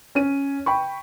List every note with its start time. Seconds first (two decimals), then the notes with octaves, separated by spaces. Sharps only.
0.15 C#4 C#5 D#7
0.66 G5 B5 C#6